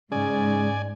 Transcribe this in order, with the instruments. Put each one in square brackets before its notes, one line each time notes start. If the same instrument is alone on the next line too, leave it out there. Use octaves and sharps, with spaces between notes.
[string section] G#2 [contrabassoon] C#3 [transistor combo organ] D5 G#5